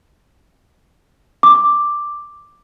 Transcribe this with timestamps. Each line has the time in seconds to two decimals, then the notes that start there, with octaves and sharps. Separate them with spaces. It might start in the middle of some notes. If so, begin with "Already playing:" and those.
1.43 D6